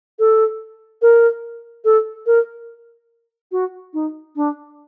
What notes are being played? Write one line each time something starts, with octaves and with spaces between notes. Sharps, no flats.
A4
A#4
A4
A#4
F#4
D#4
D4